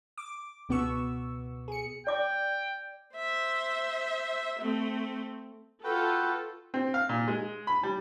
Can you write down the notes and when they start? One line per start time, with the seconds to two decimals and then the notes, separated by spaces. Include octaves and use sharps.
0.18 D6
0.69 C#2 B2 B3 F#4 C#6 E6
1.68 G#4 C#7
2.07 D5 G5 D6
3.16 C5 E5
4.59 A3 C4
5.84 F4 F#4 A4 B4 G5
6.74 C4
6.94 F5
7.09 A#2
7.28 G#3
7.67 B5
7.83 G3